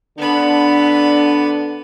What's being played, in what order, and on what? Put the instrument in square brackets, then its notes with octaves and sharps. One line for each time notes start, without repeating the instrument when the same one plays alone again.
[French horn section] D3 D4 [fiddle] B3 B5